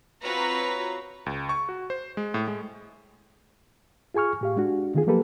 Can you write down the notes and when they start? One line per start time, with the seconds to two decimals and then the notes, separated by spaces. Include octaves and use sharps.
0.22 C4 F4 F#4 B4 C#5 A#5
1.26 C#2
1.49 C#6
1.69 F#4
1.90 C5
2.17 G#3
2.34 A2
2.47 G#3
4.14 F4 G#4 G#5 C#6 F6
4.41 A2 G4 F5
4.56 G#3 D4 F#4
4.94 D3 D#3 B3 F4 G#4
5.07 F3 F#3 A#3 G4 A4 B4